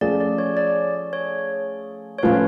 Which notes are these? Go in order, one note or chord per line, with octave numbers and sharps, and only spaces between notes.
F3 A3 C#4 G#4 D5
D5
C#5
D5
C#5
C#5
A2 F3 A3 C#4 F4 B4